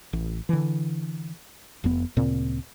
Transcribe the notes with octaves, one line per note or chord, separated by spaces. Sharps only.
A1
D3 E3
F1 F2 B3
D2 A#2 C#3 C4